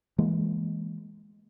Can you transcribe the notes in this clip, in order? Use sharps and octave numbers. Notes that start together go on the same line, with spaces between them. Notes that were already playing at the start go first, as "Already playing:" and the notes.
E3 G#3 A#3